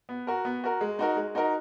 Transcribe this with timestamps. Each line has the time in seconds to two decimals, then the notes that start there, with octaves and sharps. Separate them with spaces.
0.09 B3
0.27 F#4 A#4
0.45 B3
0.64 F#4 A#4
0.81 G#3
0.99 D#4 F#4 A#4
1.16 G#3
1.35 D#4 F#4 A#4